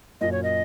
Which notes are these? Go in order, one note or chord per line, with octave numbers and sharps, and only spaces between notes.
F#2 A#2 D#5
C#5
D#5